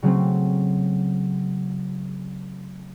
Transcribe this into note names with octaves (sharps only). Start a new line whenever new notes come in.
C#3 F#3 A3 C4